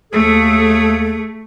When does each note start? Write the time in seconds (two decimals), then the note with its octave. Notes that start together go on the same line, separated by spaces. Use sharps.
0.13 D#2 A3 G#4 A4